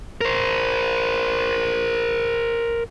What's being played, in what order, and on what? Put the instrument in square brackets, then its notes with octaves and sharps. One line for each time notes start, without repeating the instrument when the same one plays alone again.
[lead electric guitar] A#4 C5